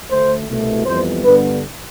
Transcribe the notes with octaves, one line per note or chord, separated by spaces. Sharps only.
D2 D3 A3 C5
C2 B2 A3
F2 E3 G3 B3 C5
G2 D3 G3 B3 B4